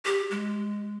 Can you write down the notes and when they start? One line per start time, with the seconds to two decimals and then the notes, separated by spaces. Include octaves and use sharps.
0.05 G4
0.31 G#3